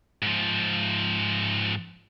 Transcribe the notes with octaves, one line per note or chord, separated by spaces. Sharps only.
G#2 F3